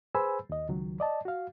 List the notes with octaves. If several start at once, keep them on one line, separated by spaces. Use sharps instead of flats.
G#4 B4 C5 G#5 B5 E6
D#2 D#5
C#2 D#3 F#3
D5 D#5 A5
F#4 F5